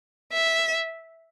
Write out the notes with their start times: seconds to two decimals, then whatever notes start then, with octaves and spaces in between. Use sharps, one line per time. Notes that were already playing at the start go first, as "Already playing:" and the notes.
0.32 E5